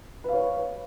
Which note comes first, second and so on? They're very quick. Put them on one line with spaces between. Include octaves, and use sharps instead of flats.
B4 F5 C#5